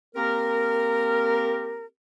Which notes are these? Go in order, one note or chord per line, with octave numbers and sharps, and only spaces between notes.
A#3 C4 G4 A#4